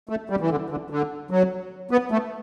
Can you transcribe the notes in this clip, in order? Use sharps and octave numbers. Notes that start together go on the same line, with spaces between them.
A3
G3
E3
D3
D3
D3
F#3
B3
A3